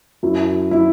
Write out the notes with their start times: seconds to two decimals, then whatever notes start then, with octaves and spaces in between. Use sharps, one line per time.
0.23 F#2 F#3 E4
0.71 F#3 E4